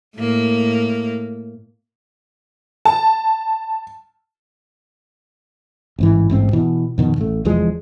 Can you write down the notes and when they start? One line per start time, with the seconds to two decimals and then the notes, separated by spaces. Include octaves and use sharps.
0.17 A2 A#3
2.85 A5
5.99 A1 G#2 E3
6.30 A1 G#2 C4
6.53 B2 E3
6.98 F2 B2 D#3
7.18 A1 A3
7.45 F1 E2 F3 G#3